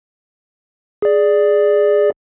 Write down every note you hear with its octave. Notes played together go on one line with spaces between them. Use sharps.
G#4 D5